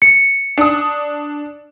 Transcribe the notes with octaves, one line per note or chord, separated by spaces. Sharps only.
C#7
D4 D#6